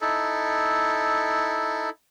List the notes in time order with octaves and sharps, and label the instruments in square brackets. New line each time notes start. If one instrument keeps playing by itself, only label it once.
[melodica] D#4 E4 A4